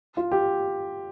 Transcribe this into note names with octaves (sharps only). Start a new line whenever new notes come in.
F4
G4